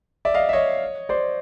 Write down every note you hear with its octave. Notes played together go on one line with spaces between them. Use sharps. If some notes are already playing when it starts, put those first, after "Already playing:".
D5 E5
D#5 F5
E5
C#5 D#5
C5 D5